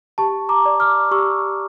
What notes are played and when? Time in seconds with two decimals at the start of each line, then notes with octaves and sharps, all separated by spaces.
0.18 G4 A5 C#6
0.49 A#5 D6
0.65 D5
0.80 D6 F6
1.11 G4 C#6 E6